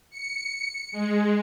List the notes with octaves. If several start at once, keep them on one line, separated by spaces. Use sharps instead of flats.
C#7
G#3